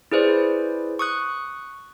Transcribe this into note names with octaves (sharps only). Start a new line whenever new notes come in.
E4 G#4 B4 C5 D5
C#6 D#6 F#6